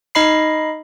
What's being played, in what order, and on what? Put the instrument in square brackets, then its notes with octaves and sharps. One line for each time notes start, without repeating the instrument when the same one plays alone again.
[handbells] D#4 D#5 B5 C7